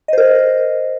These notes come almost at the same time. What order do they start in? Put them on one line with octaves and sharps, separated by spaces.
D#5 C5 A#4